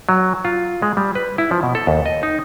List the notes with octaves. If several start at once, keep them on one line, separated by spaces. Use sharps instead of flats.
F#3
F4
G#3
G3
B4
E4
F3
B2
A4
D#2
D#5
D#4